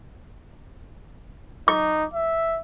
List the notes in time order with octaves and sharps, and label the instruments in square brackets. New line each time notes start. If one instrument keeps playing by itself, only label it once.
[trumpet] D#4 [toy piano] D6
[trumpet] E5